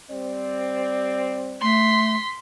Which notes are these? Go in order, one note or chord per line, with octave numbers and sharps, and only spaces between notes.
G3 C4 D5
A3 C6 B6